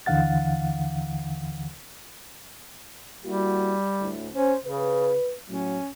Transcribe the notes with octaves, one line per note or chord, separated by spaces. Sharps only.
D#2 D3 E3 F5 F#5 A6
G3 A#3 E4 F#4
D2 A2
C#4 C5
C#3 B4
A2 F#3 C#4